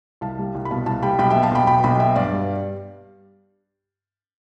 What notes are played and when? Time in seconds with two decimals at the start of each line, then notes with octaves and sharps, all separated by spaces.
0.21 C2 F5 A5
0.39 G3
0.55 C2
0.65 B5
0.71 B2 F5 A5
0.86 C2 F5 A5
1.03 G3 G5 B5
1.19 B1 G5 B5
1.30 E5 G5
1.35 B3
1.43 F5 A5
1.51 B1 G5 B5
1.67 B2 G5 B5
1.84 B1 G5 B5
2.00 B3 E5 G5
2.16 G2 D5 F5
2.32 G3